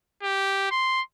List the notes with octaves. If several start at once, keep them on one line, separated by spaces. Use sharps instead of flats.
G4
C6